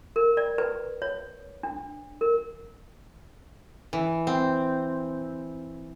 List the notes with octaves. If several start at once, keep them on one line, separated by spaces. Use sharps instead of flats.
A#4
D5
B4
C#5
D4
A#4
E3
C4